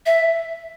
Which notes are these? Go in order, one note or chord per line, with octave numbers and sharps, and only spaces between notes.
E5